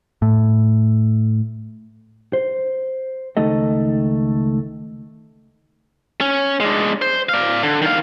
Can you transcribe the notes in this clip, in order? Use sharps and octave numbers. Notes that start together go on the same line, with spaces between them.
A2
C5
C#2 D#3 A3 A4 D#5
C#4
G#3 D4
C5
D5 F5
D3
D#3 F5